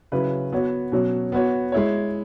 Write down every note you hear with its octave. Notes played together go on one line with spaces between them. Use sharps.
C#3 F#3 E4 B4
B3 F#4 C#5
B2 F#3 C#4
B3 F#4 C#5
G#3 E4 C#5